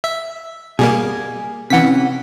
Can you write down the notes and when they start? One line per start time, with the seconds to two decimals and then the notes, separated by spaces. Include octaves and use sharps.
0.04 E5
0.79 B2 G3 A#3 G#4
1.70 C3 E3 C#4 F#5 B6